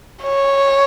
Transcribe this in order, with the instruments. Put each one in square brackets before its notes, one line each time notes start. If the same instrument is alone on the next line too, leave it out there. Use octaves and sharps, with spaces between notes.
[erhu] C#5